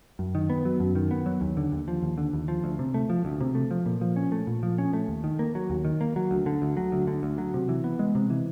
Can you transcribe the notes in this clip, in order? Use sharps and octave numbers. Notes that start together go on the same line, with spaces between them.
F#2
D#3
B3
F#3
F#2
D#3
B3
F#3
D#2
D3
D#2
F3
D#2
D3
D#2
F3
D2
C3
A3
F3
D2
C3
A3
F3
A#2
F3
C#4
A3
A#2
F3
C#4
A3
D#2
D#3
A#3
F#3
D#2
D#3
A#3
F#3
D2
D3
D2
F#3
D2
D3
D2
F#3
C3
E3
B3
G#3
C3
E3